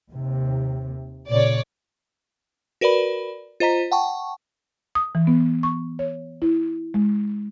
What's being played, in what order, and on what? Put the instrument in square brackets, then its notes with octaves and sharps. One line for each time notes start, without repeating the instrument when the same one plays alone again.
[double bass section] D#2 C3
[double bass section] A#2 C#3 [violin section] C#5 D5
[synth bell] F#4 A#4 B4 D5 B5
F4 C5 D#5 A#5 B6
F#5 G5 A5 C#6
[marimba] D#6
E3
B3
C#6
C#5
E4
G#3